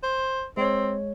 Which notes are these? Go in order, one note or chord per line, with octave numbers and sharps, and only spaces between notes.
C5
G#3 C4 C#5